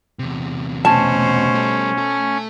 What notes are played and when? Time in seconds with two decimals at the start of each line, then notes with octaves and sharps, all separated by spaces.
0.19 E2 C3
0.85 B2 A3 C#4 C5 A5
1.55 G3 A4
1.98 A3 A4